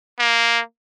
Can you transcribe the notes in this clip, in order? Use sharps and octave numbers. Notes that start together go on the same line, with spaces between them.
A#3